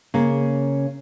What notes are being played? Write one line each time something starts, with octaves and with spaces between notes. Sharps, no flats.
C#3 A#3